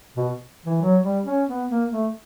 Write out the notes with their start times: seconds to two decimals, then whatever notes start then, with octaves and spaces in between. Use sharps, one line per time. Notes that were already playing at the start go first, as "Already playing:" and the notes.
0.16 B2
0.65 E3
0.81 F#3
1.03 G3
1.25 C#4
1.48 B3
1.69 A#3
1.91 A3